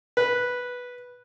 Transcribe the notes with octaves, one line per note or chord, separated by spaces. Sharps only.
B4